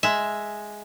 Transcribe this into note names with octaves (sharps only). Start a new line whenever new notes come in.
G#3 E5